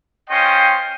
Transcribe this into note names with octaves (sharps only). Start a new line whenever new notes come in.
C#4 F4 C5 D#5 G5 C6